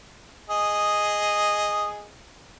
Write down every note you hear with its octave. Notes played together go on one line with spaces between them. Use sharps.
G#4 D#5